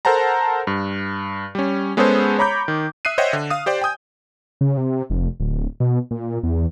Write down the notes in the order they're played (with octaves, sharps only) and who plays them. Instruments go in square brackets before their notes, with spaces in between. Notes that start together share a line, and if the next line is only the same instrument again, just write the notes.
[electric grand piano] A4 A#4 C5 F#5 A5 A#5
G2
G3 C#4
G#3 B3 C#4 G#4 A4 C5
C#5 A#5 B5 D6 G6
D#3
E5 D#6 F#6 C7 D#7
C5 C#5 D#5 E5 F#5 G5
D3
F5 D#6
G4 C5 D5 G5
G5 G#5 D#6 G6
[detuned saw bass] C#3
C3
F1
D1
B2
A#2
E2